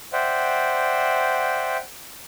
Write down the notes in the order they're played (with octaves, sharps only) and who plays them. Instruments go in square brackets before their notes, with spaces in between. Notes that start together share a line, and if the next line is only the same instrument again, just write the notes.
[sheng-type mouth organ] C5 D5 E5 F#5 G5